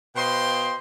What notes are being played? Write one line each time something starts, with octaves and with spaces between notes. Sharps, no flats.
B2 C5 D#5 F5 G5 C6